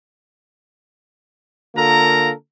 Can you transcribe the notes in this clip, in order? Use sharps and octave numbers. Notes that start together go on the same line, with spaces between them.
D3 A#3 F4 A4 A#4 A#5